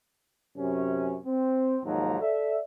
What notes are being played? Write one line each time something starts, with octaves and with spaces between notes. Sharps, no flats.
F#2 C3 C#4
C4
D#2 G#2 F3 F#3 A#5
A4 D5 E5